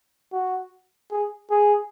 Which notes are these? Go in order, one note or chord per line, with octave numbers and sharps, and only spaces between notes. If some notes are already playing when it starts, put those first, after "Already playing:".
F#4
G#4
G#4